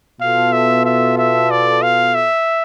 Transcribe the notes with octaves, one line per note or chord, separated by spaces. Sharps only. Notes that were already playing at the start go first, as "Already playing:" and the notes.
B2 B3 F4 A4 F5
E5
E5
E5
D5
F5
E5